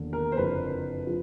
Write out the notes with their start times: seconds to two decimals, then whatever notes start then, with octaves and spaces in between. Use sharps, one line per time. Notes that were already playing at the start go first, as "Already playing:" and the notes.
Already playing: E1 D#2 D3
0.13 A#4
0.32 C5
0.36 F#1 F2 D3 B4
1.07 F3